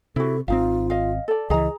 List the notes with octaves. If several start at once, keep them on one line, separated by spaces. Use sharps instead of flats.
C3 E4 F#4 A4
G#1 C4 D#4 F4 F5
D#5 F5
A4 D5
C#2 E3 G#4 D#5 A#5